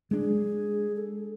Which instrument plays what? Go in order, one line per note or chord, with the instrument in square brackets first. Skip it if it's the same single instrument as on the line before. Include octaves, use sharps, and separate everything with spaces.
[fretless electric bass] G#3 D4 [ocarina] G#4
[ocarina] A4